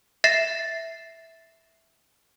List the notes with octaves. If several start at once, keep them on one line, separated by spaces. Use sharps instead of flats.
E5 A6 A#6 C7 E7